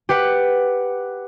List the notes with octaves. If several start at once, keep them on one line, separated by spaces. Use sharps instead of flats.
G4 B4 F#5